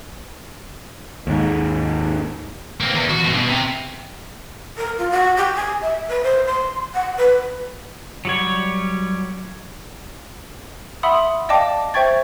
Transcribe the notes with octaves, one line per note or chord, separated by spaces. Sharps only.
D#2 G#2
A#3 C4
E2
F#4
G2 B2
B2
C3
A#4
F4
F#4
G4
G#5
E5
B4
C5
C6
F#5
B4
F#3 G3 C#5
E5 F#5 B5 C6 D#6 E6
D5 D#5 F5 G5 A5 D6
C5 E5 G5 C#6 G#6 A6